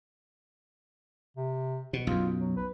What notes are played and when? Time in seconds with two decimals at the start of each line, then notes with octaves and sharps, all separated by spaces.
1.37 C3
1.93 B2
2.07 B1 F#2 F4
2.39 F#3
2.57 B4